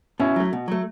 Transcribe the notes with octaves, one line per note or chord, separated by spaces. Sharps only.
B2 C#4 E4
F#3 A3
B2
F#3 A3